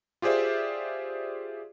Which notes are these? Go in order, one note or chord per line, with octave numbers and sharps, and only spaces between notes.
F4 G4 G#4 C5 D5 E5